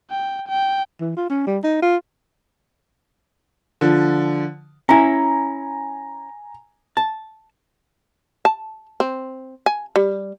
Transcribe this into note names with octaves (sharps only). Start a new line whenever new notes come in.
G5
G5
E3
F4
C#4
G3
D#4
F4
D3 F3
C#4 E4 G#5 A#5
A5
A5
C4
G#5
G3